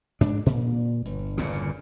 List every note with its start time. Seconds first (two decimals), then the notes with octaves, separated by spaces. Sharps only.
0.21 G#2 D4
0.46 A#2
1.05 G1
1.37 G1 E2 A#2 C#3